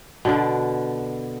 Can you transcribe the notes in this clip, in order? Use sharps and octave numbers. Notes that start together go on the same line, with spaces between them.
B2 D3 D4